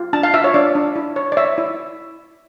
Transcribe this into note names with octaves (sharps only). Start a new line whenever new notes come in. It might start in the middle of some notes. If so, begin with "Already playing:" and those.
Already playing: F4
D4 A5
F5
F4 E5
C#5
D4 D5
D4
E4
C#5
D5
C#5 E5
E4